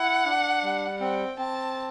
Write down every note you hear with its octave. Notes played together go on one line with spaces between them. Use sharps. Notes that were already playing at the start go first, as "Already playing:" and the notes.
Already playing: E4 F#5
D4
G3
C4 G5
C4 A5